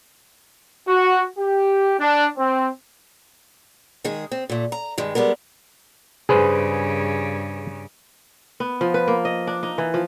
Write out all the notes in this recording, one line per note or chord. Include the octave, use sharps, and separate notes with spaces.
F#4
G4
D4
C4
D#3 G#3 G#4
C4
A#2 A3
A#5
G2 D#3 G#3
G3 G#3 B3 A#4
G2 C#3 G#4 B4 C5
B3
F3
B4
A#3
D#5
D4
D#4
E3
F3